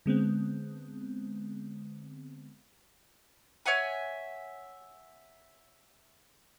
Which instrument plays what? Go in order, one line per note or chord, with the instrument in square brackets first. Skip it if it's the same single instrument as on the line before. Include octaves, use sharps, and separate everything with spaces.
[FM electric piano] D3 G#3 B3 C4
[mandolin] C#5 E5 F#5 G#5